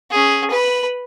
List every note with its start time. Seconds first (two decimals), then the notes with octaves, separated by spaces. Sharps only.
0.10 C#4 G#4
0.50 B4 B5